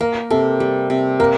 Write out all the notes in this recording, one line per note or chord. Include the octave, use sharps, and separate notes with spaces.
A#3 A#4
C3 A4
G3
C3
A#3 A#4